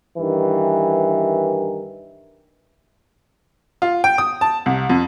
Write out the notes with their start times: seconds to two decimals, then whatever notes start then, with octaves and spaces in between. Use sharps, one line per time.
0.18 G2 D#3 E3
3.82 F4
4.04 G5
4.18 D#6
4.41 A5
4.66 C2
4.90 F2